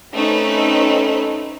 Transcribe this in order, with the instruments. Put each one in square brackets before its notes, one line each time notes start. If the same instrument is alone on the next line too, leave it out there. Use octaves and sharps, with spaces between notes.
[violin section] A3 C4 C#4 D#4 B4